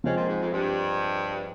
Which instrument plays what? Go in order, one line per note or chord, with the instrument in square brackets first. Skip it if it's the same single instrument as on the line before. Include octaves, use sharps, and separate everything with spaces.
[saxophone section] C#3 [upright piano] F3 G#3 C4
[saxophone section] A#2
G#2
F2
G2